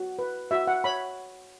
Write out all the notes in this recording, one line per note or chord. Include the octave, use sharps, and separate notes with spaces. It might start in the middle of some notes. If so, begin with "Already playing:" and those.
Already playing: F#4
B4
F#4 E5
F#5
C#5 B5